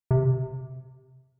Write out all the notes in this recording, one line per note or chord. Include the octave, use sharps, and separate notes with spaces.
C3